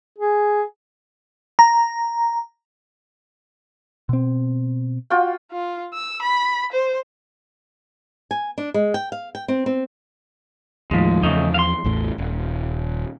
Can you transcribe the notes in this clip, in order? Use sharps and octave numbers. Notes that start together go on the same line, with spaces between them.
G#4
A#5
B2 C4
F4 F#4 G5
F4
E6
B5
C5
G#5
D4
G#3
G5
F5
G5
C4
C4
D#2 A2 F3 G#3
E2 C#3 F3 A3 D#4
F5 C6
A1 E2 A2
D#1